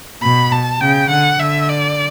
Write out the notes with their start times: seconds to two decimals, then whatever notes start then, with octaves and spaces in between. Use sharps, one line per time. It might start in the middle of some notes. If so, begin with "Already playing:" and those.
0.23 B2 B5
0.52 A5
0.81 C#3 G5
1.10 D3 F#5
1.40 D3 E5
1.70 D5